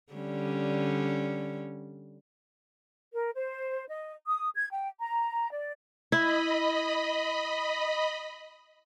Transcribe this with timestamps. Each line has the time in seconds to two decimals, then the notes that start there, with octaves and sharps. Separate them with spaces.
0.13 D3 G3 C#4
3.13 A#4
3.35 C5
3.88 D#5
4.26 D#6
4.56 G#6
4.71 G5
5.00 A#5
5.52 D5
6.12 E4 D#5 B5